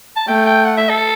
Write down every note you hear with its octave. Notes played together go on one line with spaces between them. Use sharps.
A5
A3 G5
G5
F#5
E5
A4